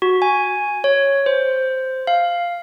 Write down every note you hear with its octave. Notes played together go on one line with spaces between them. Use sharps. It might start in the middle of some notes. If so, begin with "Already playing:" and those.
F#4
G#5
C#5
C5
F5